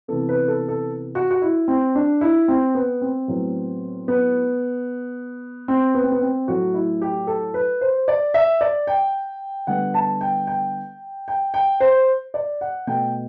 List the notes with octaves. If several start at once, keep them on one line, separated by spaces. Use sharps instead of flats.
C3 E3 B3 A4
B4
A4
A4
F#4
F#4
E4
C4
D4
E4
C4
B3
C4
A2 F#3 B3
B3
C4
B3
C4
B3
C4
A2 F#3 A3 F#4
E4
G4
A4
B4
C5
D5
E5
D5
G5
D3 G3 B3 F#5
A5
G5
G5
G5
G5
C5
D5
F#5
B2 A3 G5